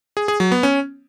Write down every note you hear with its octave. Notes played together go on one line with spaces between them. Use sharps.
G#4
G#4
F#3
B3
C#4